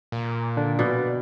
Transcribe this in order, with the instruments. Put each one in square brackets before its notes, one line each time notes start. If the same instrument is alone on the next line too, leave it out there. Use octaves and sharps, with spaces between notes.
[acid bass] A#2
[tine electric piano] D3 D4
[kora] B2 [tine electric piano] B4 D5